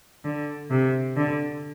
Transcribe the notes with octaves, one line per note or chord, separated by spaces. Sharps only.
D3
C3
D3